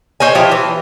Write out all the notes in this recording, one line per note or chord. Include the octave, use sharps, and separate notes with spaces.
C5 C#5 D#5 G#5
F3 E4 G4
E3